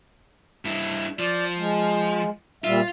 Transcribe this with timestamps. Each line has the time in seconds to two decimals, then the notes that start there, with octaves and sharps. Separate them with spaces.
0.65 G2 E4
1.19 F3 D5
1.58 G#3
2.64 A#2 G3 F4 E5